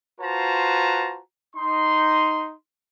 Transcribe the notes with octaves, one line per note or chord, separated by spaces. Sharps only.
F4 F#4 B4 C5 A5 A#5
D#4 C6